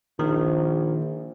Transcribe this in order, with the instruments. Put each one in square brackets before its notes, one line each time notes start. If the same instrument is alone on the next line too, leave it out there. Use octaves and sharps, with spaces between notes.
[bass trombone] A#1 [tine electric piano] D#3